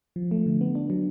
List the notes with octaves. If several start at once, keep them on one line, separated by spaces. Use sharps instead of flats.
F3
A3
D3
B3
D4
F#3